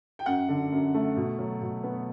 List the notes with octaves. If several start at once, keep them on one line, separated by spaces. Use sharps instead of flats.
G5
F#2 F#5
D3
F#2
A3
B2
F#3
B2
B3